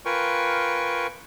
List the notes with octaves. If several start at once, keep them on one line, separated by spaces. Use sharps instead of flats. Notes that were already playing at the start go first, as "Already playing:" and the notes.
F4 A#4 B4 G5 G#5 C#6